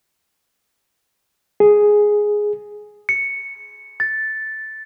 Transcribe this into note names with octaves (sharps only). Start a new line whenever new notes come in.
G#4
C#7
A6